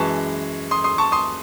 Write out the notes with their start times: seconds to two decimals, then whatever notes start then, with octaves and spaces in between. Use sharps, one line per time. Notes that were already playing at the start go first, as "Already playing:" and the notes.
Already playing: F#2 E3 G#3 A5 C#6
0.71 C6 D#6
0.84 C6 D#6
0.98 A5 C#6
1.12 C6 D#6